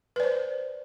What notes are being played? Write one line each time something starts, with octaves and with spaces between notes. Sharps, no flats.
B4 C5 D5